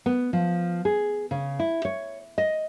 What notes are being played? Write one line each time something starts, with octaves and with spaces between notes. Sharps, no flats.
B3
F3
G#4
C#3
E4
C#5
D#5